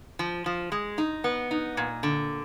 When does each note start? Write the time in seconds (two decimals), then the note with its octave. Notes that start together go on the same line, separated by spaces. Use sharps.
0.19 F3
0.46 F3
0.72 G#3
0.98 D#4
1.24 B3
1.51 D#4
1.77 A#2
2.03 D3